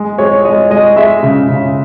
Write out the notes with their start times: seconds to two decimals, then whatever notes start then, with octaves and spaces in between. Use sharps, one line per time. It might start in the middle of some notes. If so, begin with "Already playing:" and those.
Already playing: G#3
0.18 G#3 C#5
0.45 G#3 D#5
0.71 G#3 D#5
0.97 G#3 E5
1.23 C#3
1.49 C#3